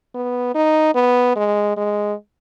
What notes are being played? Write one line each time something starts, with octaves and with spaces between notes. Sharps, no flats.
B3
D#4
B3
G#3
G#3